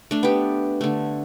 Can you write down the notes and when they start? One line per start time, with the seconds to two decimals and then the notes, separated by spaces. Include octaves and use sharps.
0.11 A3 D4
0.23 B3 G4
0.81 D3 A3